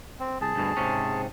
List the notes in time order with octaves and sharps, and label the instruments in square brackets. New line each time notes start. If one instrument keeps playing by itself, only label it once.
[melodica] C4
[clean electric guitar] C2 [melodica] G#4 A5
[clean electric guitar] D2 G2 B2
G#2 C3 C#4